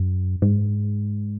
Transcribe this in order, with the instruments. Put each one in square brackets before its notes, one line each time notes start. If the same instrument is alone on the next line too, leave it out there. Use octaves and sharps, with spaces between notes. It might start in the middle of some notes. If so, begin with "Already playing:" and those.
Already playing: [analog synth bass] F#2
G#2